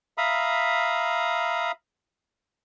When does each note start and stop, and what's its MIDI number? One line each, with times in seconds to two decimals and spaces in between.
0.18 1.72 76
0.18 1.72 77
0.18 1.72 82
0.18 1.72 83
0.18 1.72 87